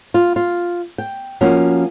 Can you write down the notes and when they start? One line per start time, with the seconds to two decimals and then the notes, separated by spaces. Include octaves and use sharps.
0.14 F4
0.36 F4
0.98 G5
1.41 F3 A#3 C#4 F#4